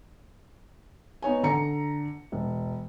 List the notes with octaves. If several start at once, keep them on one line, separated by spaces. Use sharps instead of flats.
B3 D#4 C#5 G#5
D3 A#5 C#7
E1